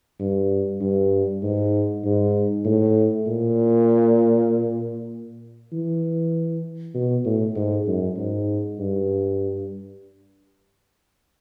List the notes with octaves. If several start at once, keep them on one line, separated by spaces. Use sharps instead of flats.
G2
G2
G#2
G#2
A2
A#2
E3
B2
A2
G#2
F#2
G#2
G2